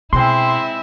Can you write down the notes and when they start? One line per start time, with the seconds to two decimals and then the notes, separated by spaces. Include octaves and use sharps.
0.13 B2 G#3 C4 E4 E5 C6